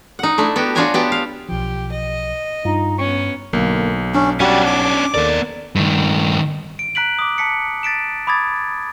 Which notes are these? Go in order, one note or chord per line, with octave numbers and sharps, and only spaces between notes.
D#4 F#5
A3 D4 E4
B3 F#4 G4
D4 F4 F#4 C#5 G#5 A#5
B3 G4 A5
F5
B1 F3 G4
D#5
G2 D#4 F4
B3 C#4 C#6
B1 D3 A#3
C#4 D4
G3 C#4 D4 F#4 F#5
D6
D#2 B3 A4 A#4 D5
G2 D#3
D7
A#5 F#6 B6 D7 F#7
D6 D#6
A5 B6 C#7
A6 B6 D7 E7
B5 D6 D#6 G#6 A6